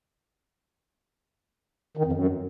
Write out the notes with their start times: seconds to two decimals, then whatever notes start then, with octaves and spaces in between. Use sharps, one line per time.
1.97 D#3
2.05 F2
2.12 F#2